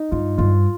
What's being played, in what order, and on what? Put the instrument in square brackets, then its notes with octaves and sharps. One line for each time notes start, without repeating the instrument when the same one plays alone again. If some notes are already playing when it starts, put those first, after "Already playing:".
Already playing: [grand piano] D#4
[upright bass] G2 [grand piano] F4
[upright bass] G2 [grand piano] F4